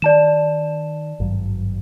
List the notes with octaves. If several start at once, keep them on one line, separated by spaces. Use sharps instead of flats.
D#3 D5 A5 E7
G#1 G2 F#3